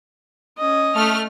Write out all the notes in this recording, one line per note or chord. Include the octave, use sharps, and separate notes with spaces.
C#4 D#5
A3 F6